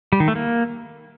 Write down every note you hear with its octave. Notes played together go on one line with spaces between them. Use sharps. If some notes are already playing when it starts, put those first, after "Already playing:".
G3
D#3
A3
A#3